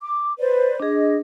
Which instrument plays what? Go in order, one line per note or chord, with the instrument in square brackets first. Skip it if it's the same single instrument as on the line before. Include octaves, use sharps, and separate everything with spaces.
[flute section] D6
B4 C5 D5
[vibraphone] D4 G#4 [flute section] D#5